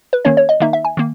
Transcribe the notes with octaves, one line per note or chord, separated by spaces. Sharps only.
B4
D#3 A#3 C#4 C#5
C#5
D#5
D#3 A#3 D#4 E5
E5
G#5
D#3 A#3